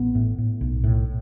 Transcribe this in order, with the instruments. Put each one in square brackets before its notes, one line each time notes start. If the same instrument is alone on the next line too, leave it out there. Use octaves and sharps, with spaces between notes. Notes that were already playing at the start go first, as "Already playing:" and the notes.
Already playing: [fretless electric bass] A1 B3
A2
A2
B1
A2